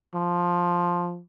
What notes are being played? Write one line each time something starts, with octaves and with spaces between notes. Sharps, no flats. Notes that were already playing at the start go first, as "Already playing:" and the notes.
F3